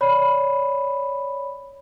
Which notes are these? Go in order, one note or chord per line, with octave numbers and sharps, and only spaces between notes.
C#5 D5 B5